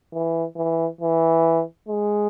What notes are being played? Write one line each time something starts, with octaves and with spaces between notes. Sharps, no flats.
E3
E3
E3
G#3